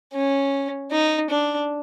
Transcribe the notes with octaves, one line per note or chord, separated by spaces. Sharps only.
C#4
D#4
D4